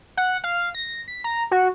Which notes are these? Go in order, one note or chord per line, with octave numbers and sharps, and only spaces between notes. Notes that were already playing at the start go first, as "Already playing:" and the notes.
F#5
F5
A#6
B6
A#5
F#4